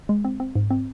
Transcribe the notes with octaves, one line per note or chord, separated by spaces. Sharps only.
G#3
C4
C4
G#2
C4